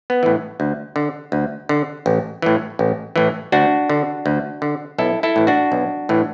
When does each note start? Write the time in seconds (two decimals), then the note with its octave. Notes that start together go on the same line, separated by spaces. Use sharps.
0.10 B3
0.23 A2 E3
0.60 D2
0.96 D3
1.32 D2
1.69 D3
2.06 A1
2.42 A2 E3
2.79 A1
3.16 A2 E3
3.52 D2 D4 F#4
3.90 D3
4.26 D2
4.62 D3
4.98 B1 E4 A4
5.23 E4 A4
5.36 A2 E3
5.47 D4 F#4
5.72 B1
6.09 A2 E3